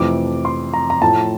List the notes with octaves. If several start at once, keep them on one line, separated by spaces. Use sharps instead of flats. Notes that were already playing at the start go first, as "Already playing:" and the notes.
Already playing: F2 C3 E3 A3 D6
C6
A#5
A#5
A2 F3 A3 A5